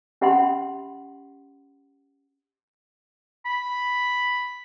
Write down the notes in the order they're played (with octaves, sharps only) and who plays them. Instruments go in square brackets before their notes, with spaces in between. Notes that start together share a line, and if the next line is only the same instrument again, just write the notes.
[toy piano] C#4 G4 E5 F#5 B5 C6
[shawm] B5